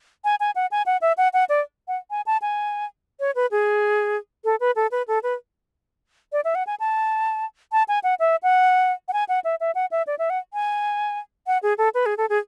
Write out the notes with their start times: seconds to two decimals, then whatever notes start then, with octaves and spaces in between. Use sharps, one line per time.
0.24 G#5
0.40 G#5
0.56 F#5
0.71 G#5
0.86 F#5
1.01 E5
1.17 F#5
1.33 F#5
1.49 D5
1.88 F#5
2.11 G#5
2.26 A5
2.42 G#5
3.20 C#5
3.35 B4
3.51 G#4
4.45 A4
4.60 B4
4.76 A4
4.91 B4
5.08 A4
5.23 B4
6.33 D5
6.44 E5
6.55 F#5
6.67 G#5
6.80 A5
7.72 A5
7.88 G#5
8.04 F#5
8.20 E5
8.43 F#5
9.08 F#5
9.13 G#5
9.29 F#5
9.44 E5
9.60 E5
9.75 F#5
9.91 E5
10.07 D5
10.19 E5
10.30 F#5
10.54 G#5
11.47 F#5
11.63 G#4
11.78 A4
11.94 B4
12.06 G#4
12.18 A4
12.30 G#4